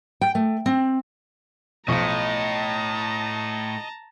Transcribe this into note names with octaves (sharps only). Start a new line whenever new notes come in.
G5
A3
C4
B1 A2 F3 D#5 A5 A#5 C#6